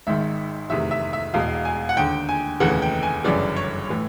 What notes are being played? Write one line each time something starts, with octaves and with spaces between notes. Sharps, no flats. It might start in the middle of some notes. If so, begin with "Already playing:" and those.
G#1 G#2 D#3 E5
F1 E2 C3 D#3 E5
E5
E5
E1 E2 B2 F5
G#5
F#5
D#2 D3 G5
G#5
F1 D#2 C#3 E3 F#5
G5
G#5
G1 F#2 C#3 E3 D5
C#5
A2 E3